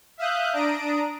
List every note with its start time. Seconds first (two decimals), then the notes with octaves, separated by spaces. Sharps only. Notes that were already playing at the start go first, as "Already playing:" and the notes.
0.17 E5 F5 D#6 F#6 G6
0.53 D4 A#5 D#6 D7